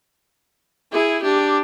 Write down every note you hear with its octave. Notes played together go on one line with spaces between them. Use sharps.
E4 G#4
D4 G4